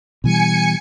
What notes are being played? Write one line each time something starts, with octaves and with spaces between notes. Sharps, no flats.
B2 E3 G3 G#5 C#7